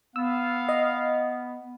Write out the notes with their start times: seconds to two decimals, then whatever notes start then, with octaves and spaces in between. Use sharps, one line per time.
0.16 B3 F5 E6
0.69 D#5